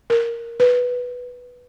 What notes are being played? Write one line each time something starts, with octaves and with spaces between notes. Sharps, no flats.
A#4
B4